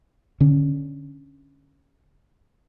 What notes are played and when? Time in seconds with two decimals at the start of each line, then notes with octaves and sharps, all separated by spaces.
0.40 D3 C#4